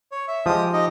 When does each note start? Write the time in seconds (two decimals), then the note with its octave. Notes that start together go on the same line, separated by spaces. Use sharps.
0.12 C#5
0.28 E5
0.46 F3 G#3 G4 D#6
0.73 D#4 G4 D#5